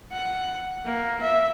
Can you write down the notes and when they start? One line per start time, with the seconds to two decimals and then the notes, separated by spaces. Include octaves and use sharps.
0.12 F#5
0.85 A#3
1.22 E5